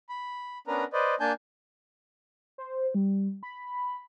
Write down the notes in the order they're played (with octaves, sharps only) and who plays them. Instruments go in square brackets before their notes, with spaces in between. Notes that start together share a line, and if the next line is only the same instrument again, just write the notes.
[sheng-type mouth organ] B5
B3 C#4 D4 A#4 B4 A#5
B4 C5 D5 D#5
A#3 D4 G#5 A5 G6
[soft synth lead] C5
G3
B5